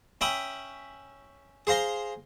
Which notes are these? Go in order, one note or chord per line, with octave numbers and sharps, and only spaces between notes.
C#4 E5 G5 B5 D#6
G#4 C5 F5 A#5 C6